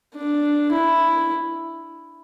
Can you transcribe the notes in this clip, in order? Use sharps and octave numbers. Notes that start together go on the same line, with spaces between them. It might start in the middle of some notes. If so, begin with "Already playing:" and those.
D4
E4